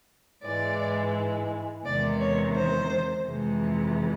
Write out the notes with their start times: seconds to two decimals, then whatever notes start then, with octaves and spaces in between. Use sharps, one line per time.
0.43 G#2 E3 G#3 D5
1.85 E2 C3 D#3 G#3 D5
2.20 C#5
2.56 C5
3.27 F2 C3 E3 G#3